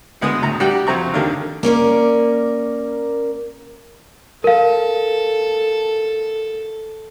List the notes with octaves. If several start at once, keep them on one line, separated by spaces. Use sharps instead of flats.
D2 G#3 B3 D#6
D2 A2 A#5
G3 F#4 G5
F2 F#3 C4 A#5 C#6
D#2 D3 D#3 D4 F5
A#3 C#4 A#4 D5
A4 A#4 F5